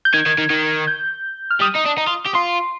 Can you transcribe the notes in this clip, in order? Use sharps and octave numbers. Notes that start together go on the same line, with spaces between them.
G6
D#3 G#6
D#3
D#3
D#3
G6
F6
G3 D#6
D#4
D4
D#4
F4
G4
F4 C6